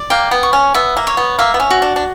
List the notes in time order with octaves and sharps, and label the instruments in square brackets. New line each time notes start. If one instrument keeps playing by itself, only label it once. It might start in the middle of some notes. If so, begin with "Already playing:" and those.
Already playing: [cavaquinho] D5
[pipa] A#3 [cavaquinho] G5
[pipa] B3
[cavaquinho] C#6
[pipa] C#4
[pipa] B3 [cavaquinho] E5
[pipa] A#3
[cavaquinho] C#5
[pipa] B3
[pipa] A#3 [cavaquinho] E5
[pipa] B3
C#4
[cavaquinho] F#4
[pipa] D4
D4